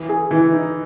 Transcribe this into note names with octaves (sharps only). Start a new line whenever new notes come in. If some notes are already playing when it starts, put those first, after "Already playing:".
Already playing: E3
G#4
E3 E4
D#4